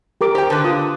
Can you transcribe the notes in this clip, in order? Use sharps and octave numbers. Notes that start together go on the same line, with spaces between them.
G4 A#4 D6
G4 C5 G5
D3 B4 A5
F4 D#6